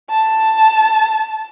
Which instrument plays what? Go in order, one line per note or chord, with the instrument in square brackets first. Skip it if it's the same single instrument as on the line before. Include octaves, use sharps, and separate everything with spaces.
[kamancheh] A5